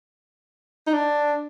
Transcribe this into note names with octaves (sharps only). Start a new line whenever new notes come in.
D#4
D4